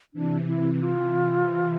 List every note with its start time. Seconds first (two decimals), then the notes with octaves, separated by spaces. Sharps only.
0.13 C3 E3 D4
0.47 E4
0.81 F4